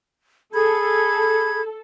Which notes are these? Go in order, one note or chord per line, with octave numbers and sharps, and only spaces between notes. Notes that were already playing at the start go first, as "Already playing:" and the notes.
G#4 A4 B5 G#6